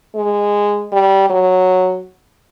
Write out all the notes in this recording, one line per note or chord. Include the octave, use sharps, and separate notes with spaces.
G#3
G3
F#3